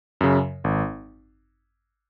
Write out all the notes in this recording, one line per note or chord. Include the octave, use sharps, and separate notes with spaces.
F#2 C#3
G#1